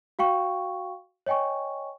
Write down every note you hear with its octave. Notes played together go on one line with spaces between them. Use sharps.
F#4 F5 G5 C#6
C#5 D#5 G5 G#5 C#6